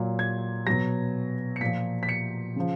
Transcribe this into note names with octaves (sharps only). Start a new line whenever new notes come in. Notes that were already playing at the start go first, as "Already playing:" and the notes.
Already playing: A#2 F#3
G#6
B2 F#3 A#6
C#7
A#2 F3 B6
B6
C#7
C#3 F3